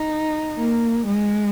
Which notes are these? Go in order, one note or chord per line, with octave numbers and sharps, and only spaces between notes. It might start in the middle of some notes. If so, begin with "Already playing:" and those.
Already playing: D#4
A#3
G#3